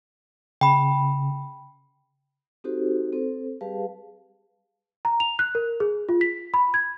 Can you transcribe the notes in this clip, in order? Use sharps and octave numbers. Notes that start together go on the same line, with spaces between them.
C#3 G5 B5
C4 D#4 F#4 G4 A4 C5
C4 A4 C5
G3 G4 G#4 B4 F5 A5
A#5
F7
F#6
A#4
G#4
F4
B6
B5
G#6